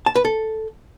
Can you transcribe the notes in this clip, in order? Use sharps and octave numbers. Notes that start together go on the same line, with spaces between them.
A5
B4
A4